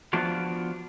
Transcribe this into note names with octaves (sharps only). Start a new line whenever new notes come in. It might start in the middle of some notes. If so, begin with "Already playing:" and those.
F3 B3 D4 F4 F#4